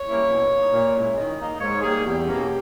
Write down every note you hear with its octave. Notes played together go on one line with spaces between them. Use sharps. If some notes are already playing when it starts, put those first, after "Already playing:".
Already playing: C#5
G3 A#3 C#4 E4
B2
A#3 D#4
A#2
G#3 C#4 E4
D#3 D#5
A#3 D#4
G#2 C#5
G3 A#3 D#4 G#4
E2 G4
B2 A#3 C#4